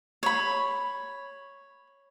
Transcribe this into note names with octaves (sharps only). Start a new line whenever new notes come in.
C#5 B5